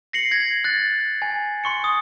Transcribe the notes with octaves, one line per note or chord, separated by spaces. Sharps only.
A#6 C7 C#7 F#7
G#6 A#6
F#6 A6
G#5
C6 C#6 C#7
D#6